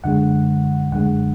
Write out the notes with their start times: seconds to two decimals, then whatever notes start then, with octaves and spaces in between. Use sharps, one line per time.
0.04 F#2 D3 G#3 F#5
0.92 F#2 D3 G#3 F#5